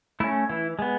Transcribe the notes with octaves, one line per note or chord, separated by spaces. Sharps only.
A3 C#4 E4
E3 E4
G#3 B3